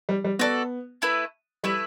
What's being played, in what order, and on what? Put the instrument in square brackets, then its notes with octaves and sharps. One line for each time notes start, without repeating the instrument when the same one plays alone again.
[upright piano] G3
G3
[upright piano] B3 [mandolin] F#4 A4 D5
[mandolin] A3 E4 B4
[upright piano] G3 [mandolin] A3 E4 B4